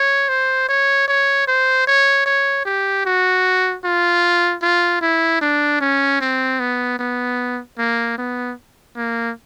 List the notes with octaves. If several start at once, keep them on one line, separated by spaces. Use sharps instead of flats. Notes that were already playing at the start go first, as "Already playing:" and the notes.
Already playing: C#5
C5
C#5
C#5
C5
C#5
C#5
G4
F#4
F4
F4
E4
D4
C#4
C4
B3
B3
A#3
B3
A#3